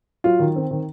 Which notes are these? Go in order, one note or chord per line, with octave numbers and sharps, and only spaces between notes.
F#3 F4
D#3
C4
D#3